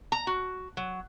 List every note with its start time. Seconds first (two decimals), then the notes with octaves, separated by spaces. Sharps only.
0.12 A#5
0.27 F#4
0.77 F#3